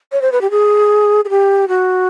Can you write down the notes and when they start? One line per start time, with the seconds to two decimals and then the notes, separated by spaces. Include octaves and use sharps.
0.12 C#5
0.22 C5
0.32 B4
0.41 G4
0.51 G#4
1.25 G#4
1.30 G4
1.68 F#4